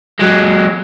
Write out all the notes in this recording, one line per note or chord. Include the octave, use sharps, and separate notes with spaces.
F#3 G#3